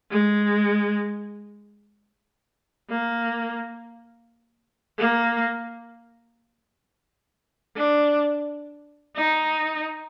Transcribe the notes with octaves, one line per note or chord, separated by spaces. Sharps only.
G#3
A#3
A#3
D4
D#4